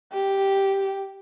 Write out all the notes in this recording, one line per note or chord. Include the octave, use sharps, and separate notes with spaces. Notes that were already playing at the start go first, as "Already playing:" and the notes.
G4